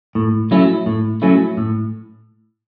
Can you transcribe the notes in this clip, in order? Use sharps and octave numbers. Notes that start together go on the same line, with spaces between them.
A2
F#3 A3 C#4 E4
A2
F#3 A3 C#4 E4
A2